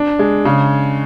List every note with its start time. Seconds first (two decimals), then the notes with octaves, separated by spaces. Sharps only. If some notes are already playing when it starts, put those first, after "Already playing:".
Already playing: D4
0.19 G#3
0.45 C#3